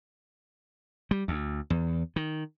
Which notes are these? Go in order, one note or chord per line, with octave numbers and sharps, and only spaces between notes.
G3
D2
E2
D#3